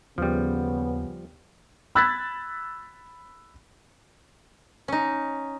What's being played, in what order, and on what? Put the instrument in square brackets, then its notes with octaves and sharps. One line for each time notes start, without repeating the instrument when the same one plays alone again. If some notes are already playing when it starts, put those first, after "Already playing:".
[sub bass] D#2 [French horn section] C#3 B3 [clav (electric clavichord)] F3 G3
[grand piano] B5 E6 F#6 G#6 A6 B6
[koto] C#4 D#4